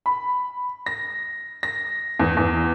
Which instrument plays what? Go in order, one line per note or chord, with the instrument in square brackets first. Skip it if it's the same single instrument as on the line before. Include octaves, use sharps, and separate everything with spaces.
[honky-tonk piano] B5
A#6
A#6
E2
E2